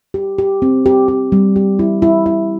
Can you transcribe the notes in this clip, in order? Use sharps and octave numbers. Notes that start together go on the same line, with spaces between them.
G4
G4
C4
G4
G4
G3
G4
E4
E4
E4